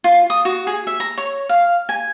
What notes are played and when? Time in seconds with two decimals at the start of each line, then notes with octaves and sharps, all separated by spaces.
0.04 F4
0.30 D#6
0.45 F#4
0.67 G#4
0.87 E5
1.00 A#5
1.18 C#5
1.49 F5
1.89 G#5